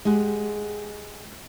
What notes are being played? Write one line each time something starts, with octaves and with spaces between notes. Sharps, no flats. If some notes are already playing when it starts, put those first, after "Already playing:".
G#3 G4 G#4 F#5